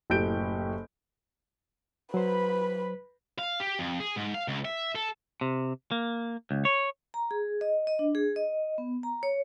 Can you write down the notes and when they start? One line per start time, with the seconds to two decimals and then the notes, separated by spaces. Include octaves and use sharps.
0.10 F#1 A2 G4 G6 D7
2.14 F#3 B4 C5 B5
3.39 F5
3.60 G4
3.79 F2
4.00 G#4
4.16 G#2
4.35 F5
4.48 C#2
4.65 E5
4.95 A4
5.41 C3
5.91 A#3
6.51 C#2
6.65 C#5
7.14 A#5
7.31 G#4
7.61 D#5
7.87 D#5
7.99 D4
8.15 G#4
8.36 D#5
8.78 B3
9.03 A#5
9.23 C#5